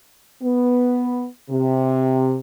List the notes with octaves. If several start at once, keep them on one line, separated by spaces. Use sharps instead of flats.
B3
C3